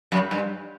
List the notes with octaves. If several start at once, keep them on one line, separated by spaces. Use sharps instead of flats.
F#2
G2